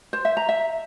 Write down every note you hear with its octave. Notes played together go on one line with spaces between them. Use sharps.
C5
E5
A#5
E5